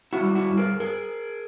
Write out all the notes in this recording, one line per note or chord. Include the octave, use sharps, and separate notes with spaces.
E4 F#4
G3
E4 F#4
G2
G#4 A#4
G#4 A#4